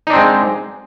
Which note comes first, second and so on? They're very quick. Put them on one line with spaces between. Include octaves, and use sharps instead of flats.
D#4 D4 C4 G#3